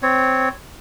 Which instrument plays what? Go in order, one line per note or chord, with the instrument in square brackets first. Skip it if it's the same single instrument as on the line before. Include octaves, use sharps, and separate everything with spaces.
[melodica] C4 C#5